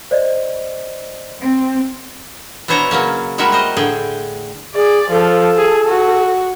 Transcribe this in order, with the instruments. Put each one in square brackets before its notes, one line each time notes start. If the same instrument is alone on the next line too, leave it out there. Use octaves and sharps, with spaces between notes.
[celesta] C5 D5 D#5
[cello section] C4
[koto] B2 D4 E4 C5 C#5 A#5
C#3 F#3 A#3 C#4
G3 G#3 E4 F#4 A#4 E5
A#4 C5 D#5
A2 D3 G#4 G5
[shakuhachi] G#4 [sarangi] D5
[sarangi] F3 [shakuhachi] A4
[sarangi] G#4
F#4